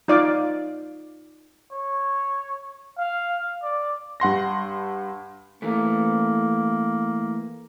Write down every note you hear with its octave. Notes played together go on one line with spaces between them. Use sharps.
D#4 F4 D5 F5 D6
C#5
F5
D5
G2 F#5 C6 A#6
E3 A3 A#3